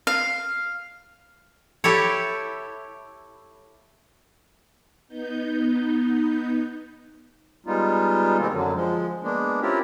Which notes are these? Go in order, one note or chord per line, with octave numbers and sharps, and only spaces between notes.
F5
E4 G4 A4 C#5
B3 D#4 G6
G3 G#3 B3 D#4 F4
B2 D#3 G#3 A#3 C4
F#2 D3 F#3
F3 G#3
G#3 A#3 B3 D4
C4 C#4 E4 F4 G4 A#4